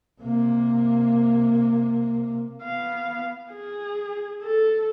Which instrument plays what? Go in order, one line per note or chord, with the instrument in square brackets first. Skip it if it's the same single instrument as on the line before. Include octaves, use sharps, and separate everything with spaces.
[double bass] C3 A#3
[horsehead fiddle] B3 F5
G#4
A4